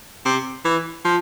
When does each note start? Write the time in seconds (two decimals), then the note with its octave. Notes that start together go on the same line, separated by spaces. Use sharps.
0.25 C3
0.65 E3
1.05 F3